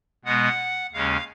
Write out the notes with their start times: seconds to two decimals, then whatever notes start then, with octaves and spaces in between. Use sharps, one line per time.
0.25 B2 G#3 B3 F#5
0.93 D#2 C#3 G#3 C#4 F5